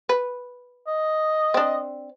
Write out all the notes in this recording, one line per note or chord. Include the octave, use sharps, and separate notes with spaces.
B4
D#5
C4 D4